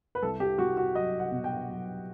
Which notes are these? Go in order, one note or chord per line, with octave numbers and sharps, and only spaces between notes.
B4
C2 A4
G4
C2 F#4
F#4
F#3 D#5
F#5
B2
G5
F#3